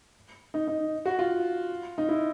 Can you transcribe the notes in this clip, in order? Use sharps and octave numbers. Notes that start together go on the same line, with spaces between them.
D#4
D#4
F#4
F4
D#4
E4